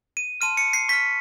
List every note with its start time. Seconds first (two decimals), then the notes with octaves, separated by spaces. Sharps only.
0.17 D#7
0.41 A5 C6 F6 D#7
0.57 C#7
0.73 C7
0.89 C#6 F6 B6